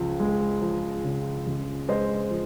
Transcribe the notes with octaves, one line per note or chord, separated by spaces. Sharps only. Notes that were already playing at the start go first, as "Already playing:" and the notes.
Already playing: C#2 F3
G#3
F3
C#3
C#2
G#3 C5 D#5
F3